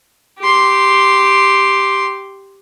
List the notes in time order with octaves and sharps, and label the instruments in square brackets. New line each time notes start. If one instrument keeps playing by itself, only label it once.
[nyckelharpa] G4 C6